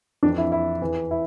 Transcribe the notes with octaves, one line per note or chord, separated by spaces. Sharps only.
F2 E3 D4
E4
E4
E2 E3
E4